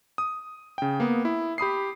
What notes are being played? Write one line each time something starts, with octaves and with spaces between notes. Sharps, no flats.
D#6
C#3 G5
A#3 B3
E4
G4 B5 D#6 C7